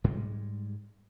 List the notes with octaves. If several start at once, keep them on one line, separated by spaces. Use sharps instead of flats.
G#2 G3 G#3